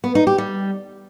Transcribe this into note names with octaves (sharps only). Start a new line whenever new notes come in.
B3
D#4
G4
G3